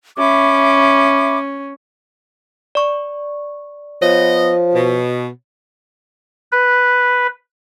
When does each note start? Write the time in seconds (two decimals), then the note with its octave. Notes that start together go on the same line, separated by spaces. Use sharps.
0.18 C#4 E5 B5 D6
2.75 D5 C#6
4.02 F3 B3 C#5 D#5
4.74 B2
6.52 B4